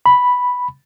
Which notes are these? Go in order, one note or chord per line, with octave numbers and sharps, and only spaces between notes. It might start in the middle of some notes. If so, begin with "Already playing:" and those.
B5